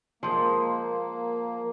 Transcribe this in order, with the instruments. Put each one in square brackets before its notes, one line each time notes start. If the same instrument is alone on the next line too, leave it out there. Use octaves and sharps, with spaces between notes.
[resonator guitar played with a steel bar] F3 G#3 [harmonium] A#3